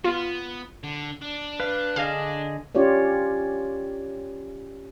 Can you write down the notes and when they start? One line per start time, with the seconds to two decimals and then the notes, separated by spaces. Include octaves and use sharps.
0.04 B3 F4
0.83 D3
1.22 D4
1.60 B4 F5
1.96 D3 G#4 D#5 F5
2.75 C#4 F4 G4 C#5 D5